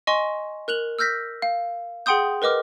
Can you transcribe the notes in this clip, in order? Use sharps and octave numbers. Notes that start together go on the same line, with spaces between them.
D#5 G#5 C6 C#6
A#4 F#6 F7 F#7
E6 F6 G6 A#6 B6
F5
G#4 F#5 G5 C6 D#6 G6
A#4 B4 D#5 D6 F6